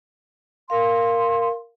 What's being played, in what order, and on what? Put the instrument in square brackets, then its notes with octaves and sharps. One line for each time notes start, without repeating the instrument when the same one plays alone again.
[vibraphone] A#4 F5 [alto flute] C6